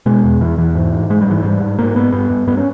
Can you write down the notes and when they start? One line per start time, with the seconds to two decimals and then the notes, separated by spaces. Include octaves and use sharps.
0.06 B2 G#3
0.24 E2
0.41 E2 E3
0.58 E2 E3
0.75 G#2
0.92 G#2
1.10 G#2 G#3
1.21 G3
1.27 G#2 E3
1.42 G#2 G3
1.61 G#2
1.79 G#2 A#3
1.96 G#2 B3
2.12 G2 B3
2.30 G2
2.47 G2 B3
2.57 C#4